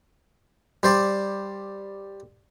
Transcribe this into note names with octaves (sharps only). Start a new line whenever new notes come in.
G3 C5 D5